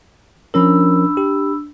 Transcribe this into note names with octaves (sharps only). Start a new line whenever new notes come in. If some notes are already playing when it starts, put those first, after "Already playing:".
F3 C#4 D4 A#4 B5 E6
G4